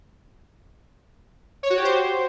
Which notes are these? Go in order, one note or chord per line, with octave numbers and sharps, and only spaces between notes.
C#5
F#4
G4
C5